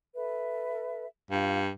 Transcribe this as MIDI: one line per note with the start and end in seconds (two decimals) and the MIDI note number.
0.15 1.05 69
0.15 1.05 71
0.15 1.05 76
1.31 1.69 43
1.31 1.59 65
1.31 1.59 77